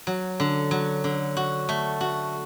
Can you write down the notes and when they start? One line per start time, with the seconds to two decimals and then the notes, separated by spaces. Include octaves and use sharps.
0.07 F#3
0.40 D3
0.71 F#3
1.04 D3
1.37 F#4
1.69 A3
2.01 F#4